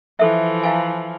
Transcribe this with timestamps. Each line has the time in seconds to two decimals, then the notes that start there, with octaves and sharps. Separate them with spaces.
0.19 E3 F3 A4 E5
0.63 E4 F5 G#5